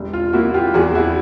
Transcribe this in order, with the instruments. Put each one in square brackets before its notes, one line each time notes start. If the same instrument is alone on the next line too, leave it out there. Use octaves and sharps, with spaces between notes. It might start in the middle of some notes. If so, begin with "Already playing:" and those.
Already playing: [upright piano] E1 G3
F4
A#3 E4 F#4
F4 G4
E2 F#4 G#4
E4 F#4